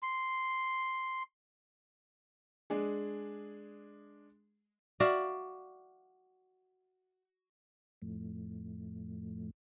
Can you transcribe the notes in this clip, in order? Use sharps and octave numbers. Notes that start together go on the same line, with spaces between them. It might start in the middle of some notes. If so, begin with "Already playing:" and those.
C6
G#3 D4 G#4
F#4 D5 E5 F5
F2 A2